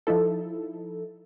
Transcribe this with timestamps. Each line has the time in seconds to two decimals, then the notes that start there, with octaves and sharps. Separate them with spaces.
0.07 F3 D#4 E4 A4